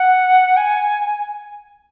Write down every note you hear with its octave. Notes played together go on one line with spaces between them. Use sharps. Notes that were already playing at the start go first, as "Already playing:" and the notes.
Already playing: F#5
G#5